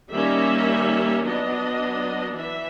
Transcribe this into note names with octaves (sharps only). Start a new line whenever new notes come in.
D#3 G3 A#3 C#4 E5
F#3 B3 D4 D#5
E3 E5